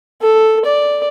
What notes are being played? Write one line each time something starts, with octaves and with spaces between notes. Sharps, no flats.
A4
D5